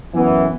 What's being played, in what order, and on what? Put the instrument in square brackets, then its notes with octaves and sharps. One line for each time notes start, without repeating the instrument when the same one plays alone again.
[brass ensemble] F#2 E3 B3